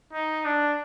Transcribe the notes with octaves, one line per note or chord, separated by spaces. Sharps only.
D#4
D4